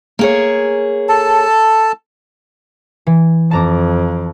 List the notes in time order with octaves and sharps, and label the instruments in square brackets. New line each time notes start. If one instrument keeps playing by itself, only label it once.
[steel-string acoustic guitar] A#3 G#4 C#5
[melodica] A4 A5
[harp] E3
[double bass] F2 [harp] A5 A#5 D6